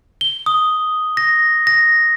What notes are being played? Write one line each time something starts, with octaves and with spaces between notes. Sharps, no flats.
G7
D#6
A#6
A#6